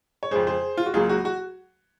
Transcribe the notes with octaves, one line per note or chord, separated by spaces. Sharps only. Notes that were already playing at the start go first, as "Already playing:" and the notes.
C#5
F2 C#3 G#3 G#4 C5
G#4 C5
F4
F#4
C#2 C#3 F#3 A#3 F4 G#4
F#4
F#4